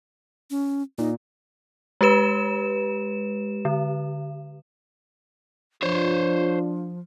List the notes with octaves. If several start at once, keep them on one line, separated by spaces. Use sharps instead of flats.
C#4
A#2 D#4
G#3 G4 B4 E7
D3
F3 D4 F4 C5 C#5